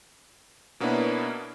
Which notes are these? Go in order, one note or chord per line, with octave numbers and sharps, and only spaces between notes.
B2 A#3 B3 C#4 D4 E4